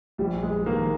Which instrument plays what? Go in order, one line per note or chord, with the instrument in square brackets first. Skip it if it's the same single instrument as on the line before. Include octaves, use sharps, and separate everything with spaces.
[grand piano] A#1 [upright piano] G3
[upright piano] G#3
[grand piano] D#3 [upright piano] A#3